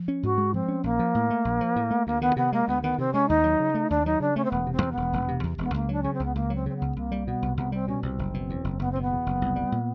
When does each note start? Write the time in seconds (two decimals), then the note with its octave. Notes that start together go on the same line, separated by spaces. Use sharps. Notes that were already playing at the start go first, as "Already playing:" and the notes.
Already playing: F3
0.08 C#4
0.23 G#2 F#4
0.38 G#3
0.54 F3 C4
0.68 C#4
0.84 A#1 A#3
0.99 F3
1.15 A2
1.30 A3
1.45 A#1
1.61 F3
1.76 A2
1.91 A3
2.07 D2 A#3
2.21 D#3 B3
2.36 C3 B3
2.53 G#3 A#3
2.68 D2 B3
2.82 D#3 B3
2.98 C3 C4
3.13 G#3 C#4
3.28 D#2 D#4
3.44 F#3
3.60 C#3
3.74 A3
3.90 D#2 D4
4.06 F#3 D#4
4.20 C#3 D4
4.36 A3 C#4
4.44 C4
4.51 E1 B3
4.67 C3
4.72 C4
4.82 E2
4.92 B3
4.97 E1
5.13 E1
5.28 C3
5.44 E2
5.58 E1 B3
5.74 C#2 A#3
5.89 F#3 D4
6.02 C#3 C#4
6.13 C4
6.20 C#2 B3
6.35 C#2 A#3
6.50 F#3 C4
6.66 C#3 C4
6.76 B3
6.81 C#2
6.96 C2 A#3
7.12 G3
7.26 B2 B3
7.42 C2
7.57 C2 B3
7.72 G3 C4
7.88 B2 C#4
8.03 C2 C4
8.19 F#1
8.34 B2
8.50 E2
8.64 F#1
8.79 F#1 B3
8.91 B2 C4
9.01 B3
9.11 E2
9.26 F#1
9.42 C2
9.56 G3
9.72 A#2